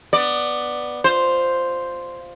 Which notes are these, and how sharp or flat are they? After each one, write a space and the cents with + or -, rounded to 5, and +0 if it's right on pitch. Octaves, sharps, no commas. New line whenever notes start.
B3 +0 D5 +10
F4 +0 C5 +0